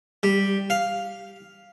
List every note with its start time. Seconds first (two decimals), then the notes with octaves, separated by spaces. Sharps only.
0.23 G3
0.70 F5